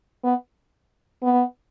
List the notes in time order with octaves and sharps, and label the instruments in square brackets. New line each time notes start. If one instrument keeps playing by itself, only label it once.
[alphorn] B3
B3